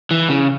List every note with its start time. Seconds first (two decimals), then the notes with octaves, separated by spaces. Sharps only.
0.11 E3
0.30 C#3